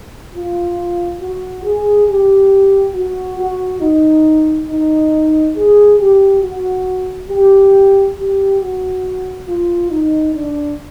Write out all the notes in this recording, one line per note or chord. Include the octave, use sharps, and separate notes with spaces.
F4
F#4
G#4
G4
F#4
F#4
D#4
D#4
G#4
G4
F#4
G4
G4
F#4
F4
D#4
D4